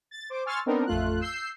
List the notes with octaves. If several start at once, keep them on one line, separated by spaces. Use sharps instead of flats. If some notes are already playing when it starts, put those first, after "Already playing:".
A6
C5 D6
G#5 C6 C#6 E6 F6 A6
B3 C4 D4 D#4 A#4
A1 F2 A3 F4 F#6
E6 G6 C7